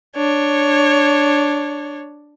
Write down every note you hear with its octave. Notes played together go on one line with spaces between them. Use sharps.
D4 C#5